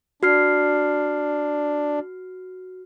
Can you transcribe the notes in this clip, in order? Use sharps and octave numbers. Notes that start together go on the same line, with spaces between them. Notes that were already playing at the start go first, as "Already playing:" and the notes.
D4 F#4 F6 C7